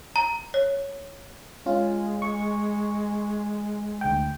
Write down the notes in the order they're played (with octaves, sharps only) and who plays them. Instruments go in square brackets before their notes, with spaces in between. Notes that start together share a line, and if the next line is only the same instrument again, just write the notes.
[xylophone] A#5
C#5
[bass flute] G#3 [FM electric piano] C#4 F4
[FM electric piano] C#6
D2 G5